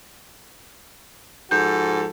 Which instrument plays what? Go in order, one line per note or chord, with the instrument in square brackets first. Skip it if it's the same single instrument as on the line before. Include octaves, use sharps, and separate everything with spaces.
[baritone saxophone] G#2 [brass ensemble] F3 F#4 A4 [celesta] G6